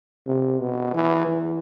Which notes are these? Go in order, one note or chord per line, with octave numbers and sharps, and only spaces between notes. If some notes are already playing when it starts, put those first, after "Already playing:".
C3
B2
E3
E3